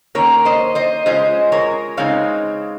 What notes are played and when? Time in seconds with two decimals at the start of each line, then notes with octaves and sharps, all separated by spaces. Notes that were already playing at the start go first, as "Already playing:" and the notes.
0.15 D#3 A#3 C#4 A#4 C#5
0.45 C5 D#5
0.75 C5 D#5
1.06 C#3 G#3 C#4 F4 C5 D#5
1.52 A#4 C#5
1.97 C#3 G#3 C4 D#4 C#5 F5